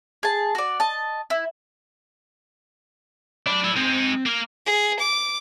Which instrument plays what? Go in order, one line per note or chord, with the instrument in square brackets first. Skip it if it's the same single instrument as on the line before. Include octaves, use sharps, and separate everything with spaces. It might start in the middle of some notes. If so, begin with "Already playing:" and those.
[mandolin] G#4 A5
F#4 D5
D#5 A5
E4
[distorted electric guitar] D4 [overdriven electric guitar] D5 B5
[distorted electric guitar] E4 A4
[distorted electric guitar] G#3 D#4 [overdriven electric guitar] C4
[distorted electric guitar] A#3 A#4
[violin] G#4
D6